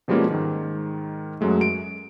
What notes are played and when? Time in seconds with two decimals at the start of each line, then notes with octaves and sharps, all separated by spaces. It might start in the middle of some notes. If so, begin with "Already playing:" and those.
0.08 B2 F3 G3 G#3 A#3 C#4
0.31 G#2 D#3
1.41 F#2 F#3 G#3 A3
1.61 D7